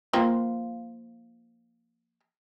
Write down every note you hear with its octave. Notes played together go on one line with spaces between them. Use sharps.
F3 A#3 C4